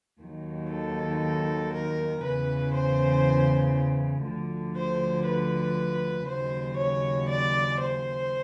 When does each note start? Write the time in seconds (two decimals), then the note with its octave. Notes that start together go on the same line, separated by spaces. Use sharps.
0.21 D#2 D#3 F#3
0.72 A4
1.74 A#4
2.24 E2 C#3 E3 B4
2.74 C5
4.25 D2 D3 F3
4.77 C5
5.26 B4
6.28 D#2 C#3 F#3 C5
6.78 C#5
7.29 D5
7.80 C5